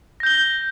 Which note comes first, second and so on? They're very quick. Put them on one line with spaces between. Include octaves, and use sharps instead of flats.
A#6 G6 G7